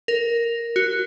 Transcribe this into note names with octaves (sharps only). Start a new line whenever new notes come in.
A#4
F#4